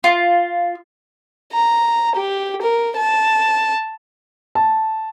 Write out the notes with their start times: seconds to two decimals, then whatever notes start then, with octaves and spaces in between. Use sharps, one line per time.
0.04 F4
1.52 A#5
2.15 G4
2.62 A#4
2.97 A5
4.55 A5